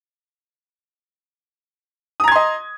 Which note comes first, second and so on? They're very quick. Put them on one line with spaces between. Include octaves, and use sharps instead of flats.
D#6 A#5 G#6 C6 D#5